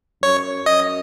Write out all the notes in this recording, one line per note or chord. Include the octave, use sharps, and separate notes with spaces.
F#2 C#5
F#2 D#5